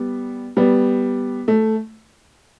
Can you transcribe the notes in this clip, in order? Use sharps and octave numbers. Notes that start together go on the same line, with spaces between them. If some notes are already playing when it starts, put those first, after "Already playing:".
Already playing: G3 B3
G3 B3
A3